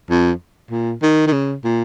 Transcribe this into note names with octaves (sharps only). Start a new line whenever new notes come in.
F2
A#2
D#3
D#3
C#3
A#2